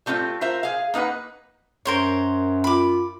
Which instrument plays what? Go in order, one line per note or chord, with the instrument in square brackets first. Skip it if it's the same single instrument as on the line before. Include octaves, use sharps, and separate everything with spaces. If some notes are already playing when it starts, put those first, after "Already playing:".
[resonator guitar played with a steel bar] G3 A3 C4 D#4 F4
F4 A#4 C5 E5
G#4 F5
A#3 D#4 B4 F#5
[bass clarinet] F#2 [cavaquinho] A#4 C5 C#5
[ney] F4 [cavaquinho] B5 D6